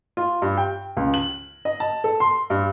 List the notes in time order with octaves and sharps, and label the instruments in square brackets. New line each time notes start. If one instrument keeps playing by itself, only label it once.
[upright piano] F4
G2
G5
C#2
F#7
D#5
A5
A4
C6
G2